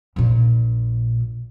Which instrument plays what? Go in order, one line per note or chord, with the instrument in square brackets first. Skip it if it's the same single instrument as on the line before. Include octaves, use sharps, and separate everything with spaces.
[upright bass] A#1 A#2